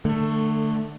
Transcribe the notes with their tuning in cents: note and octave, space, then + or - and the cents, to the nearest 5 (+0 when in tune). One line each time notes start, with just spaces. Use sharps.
D3 +25 A3 +10